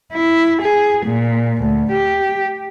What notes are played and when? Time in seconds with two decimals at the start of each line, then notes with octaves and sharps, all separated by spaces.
0.13 E4
0.62 G#4
1.07 A#2
1.62 D2
1.92 G4